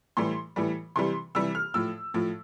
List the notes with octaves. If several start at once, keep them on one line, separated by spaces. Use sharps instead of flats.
A2 E3 G3 C6
A2 E3 G3
C3 E3 G3 C6
C3 E3 G3 E6
F6
A2 F3 E6
A2 F3